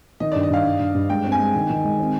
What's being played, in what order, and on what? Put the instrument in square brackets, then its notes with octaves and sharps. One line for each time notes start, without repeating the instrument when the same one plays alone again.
[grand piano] D#3 [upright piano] D#5
[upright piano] D5
[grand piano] G2
[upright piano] D#5
[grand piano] G2 [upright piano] F5
[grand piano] G2
G2
G2
[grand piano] G#3 [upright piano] G5
[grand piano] C4
[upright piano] G#5
[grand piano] G#3
D#3
D#3
G#3
C4